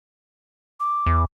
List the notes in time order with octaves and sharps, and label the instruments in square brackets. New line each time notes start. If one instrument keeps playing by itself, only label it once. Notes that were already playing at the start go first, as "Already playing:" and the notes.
[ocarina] D6
[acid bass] E2